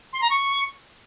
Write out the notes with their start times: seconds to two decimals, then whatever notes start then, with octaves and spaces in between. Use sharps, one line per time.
0.13 C6
0.22 A#5
0.30 C#6